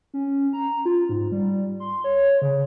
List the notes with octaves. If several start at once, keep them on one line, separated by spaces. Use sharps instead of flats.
C#4
A#5
F4
G#2
G3
C6
C#5
C#3